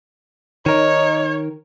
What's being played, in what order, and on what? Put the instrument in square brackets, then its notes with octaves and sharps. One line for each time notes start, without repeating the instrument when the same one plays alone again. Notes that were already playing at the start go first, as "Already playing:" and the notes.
[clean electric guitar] D#3 A#4 [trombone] D#4 [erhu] C#5